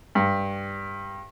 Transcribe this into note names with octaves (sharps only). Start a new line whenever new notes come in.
G2